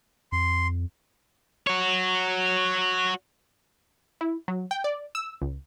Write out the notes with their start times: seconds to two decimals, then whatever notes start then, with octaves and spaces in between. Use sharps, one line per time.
0.32 F2 C6
1.67 F#4 C#5
4.21 E4
4.48 F#3
4.71 G5
4.84 D5
5.15 E6
5.41 C#2